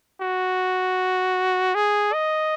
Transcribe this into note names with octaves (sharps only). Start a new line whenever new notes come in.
F#4
G#4
D#5